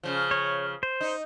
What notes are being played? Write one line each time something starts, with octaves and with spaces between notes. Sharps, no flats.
C#3 F3
C#5
C5
D#4